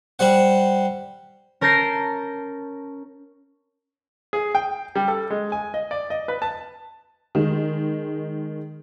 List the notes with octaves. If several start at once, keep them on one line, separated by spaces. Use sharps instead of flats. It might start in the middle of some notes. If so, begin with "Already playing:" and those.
G3 C5 F#5
C#4 A#4 A5 G6 A#6 C7
G#4
G5
G3
A4
G#3
G#5
D#5
D5
D#5
B4
A5
D#3 G#3